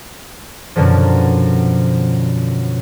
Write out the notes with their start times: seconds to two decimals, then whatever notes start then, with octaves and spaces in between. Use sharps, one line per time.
0.76 F#2 B2 D3 F3